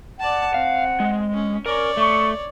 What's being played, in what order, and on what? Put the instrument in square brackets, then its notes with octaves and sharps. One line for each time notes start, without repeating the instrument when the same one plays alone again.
[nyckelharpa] D5 A5 [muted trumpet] F#5
[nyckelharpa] C4 [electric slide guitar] F5
[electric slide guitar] G#3
[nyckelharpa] C#4
[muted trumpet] C#4 [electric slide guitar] A#4 [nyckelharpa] C#5 D5
[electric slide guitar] A3 [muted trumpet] C#6